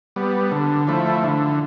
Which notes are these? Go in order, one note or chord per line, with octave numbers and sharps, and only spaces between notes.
G3 B3
D3
F3 A3 E4
D3